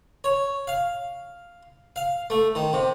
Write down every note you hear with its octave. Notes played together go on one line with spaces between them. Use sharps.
C#5
F5
F5
A3
D#3
C3